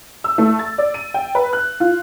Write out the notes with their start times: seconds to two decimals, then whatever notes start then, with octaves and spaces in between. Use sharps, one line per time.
0.24 E6
0.38 A3
0.59 A6
0.78 D5
0.94 D#7
1.14 G5
1.35 B4
1.53 F#6
1.80 F4